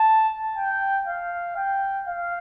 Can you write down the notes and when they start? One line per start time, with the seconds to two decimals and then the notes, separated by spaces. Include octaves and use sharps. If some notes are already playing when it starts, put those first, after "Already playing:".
Already playing: A5
0.57 G5
1.07 F5
1.57 G5
2.07 F5